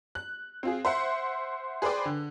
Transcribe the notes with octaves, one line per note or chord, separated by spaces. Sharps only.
F#6
C4 F4 G#4
C5 E5 F#5
G#4 B4 C5 D5 G5 D6
D3